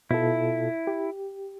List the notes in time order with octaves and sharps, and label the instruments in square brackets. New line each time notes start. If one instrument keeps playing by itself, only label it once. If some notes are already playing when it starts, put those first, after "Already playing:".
[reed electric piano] B2 F4 A4 [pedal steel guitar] E4
[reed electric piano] G4